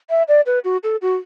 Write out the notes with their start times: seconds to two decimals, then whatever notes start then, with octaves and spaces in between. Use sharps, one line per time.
0.10 E5
0.28 D5
0.46 B4
0.64 F#4
0.84 A4
1.02 F#4